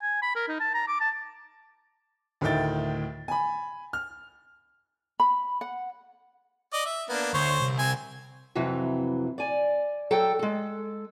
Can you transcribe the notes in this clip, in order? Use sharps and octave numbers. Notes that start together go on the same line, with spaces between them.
G#5
B5
A#4
D#4
A5
A#5
D6
A5
D2 A2 D#3 E5 G5 A6
G#5 B5
F6
B5
F#5
D5 D#5
E5
A#3 B3 D4
D2 C5 C#5
C2
C4 G#5
F2 C3 E3 F#3 B4
D5 G#5
F#3 A4 G5
G#3 A4